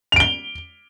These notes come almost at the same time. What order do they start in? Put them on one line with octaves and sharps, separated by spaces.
F7 D7 G7